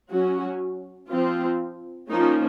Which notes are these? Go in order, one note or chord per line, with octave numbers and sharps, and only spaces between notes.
F#3 C#4 F#4
F3 C4 F4
F3 A#3 C#4 D#4